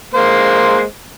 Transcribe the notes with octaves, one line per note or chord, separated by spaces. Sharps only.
G#3 A#3 C5